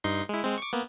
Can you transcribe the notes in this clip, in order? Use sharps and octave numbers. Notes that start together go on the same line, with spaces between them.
G2 D#4 C6
G#3 E4
G#3 C4
C#6 D6
A#3 B3